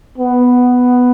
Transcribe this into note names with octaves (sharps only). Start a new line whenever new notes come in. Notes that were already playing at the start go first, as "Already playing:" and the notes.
B3